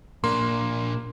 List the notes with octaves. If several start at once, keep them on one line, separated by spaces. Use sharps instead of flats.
A#2 A#3 D4 C6